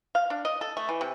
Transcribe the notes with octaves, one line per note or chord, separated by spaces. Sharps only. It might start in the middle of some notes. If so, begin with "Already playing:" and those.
F5
D4
D#5
A4
A3
E3
C3